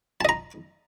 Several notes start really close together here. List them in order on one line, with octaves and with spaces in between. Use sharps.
A5 D#5 A#5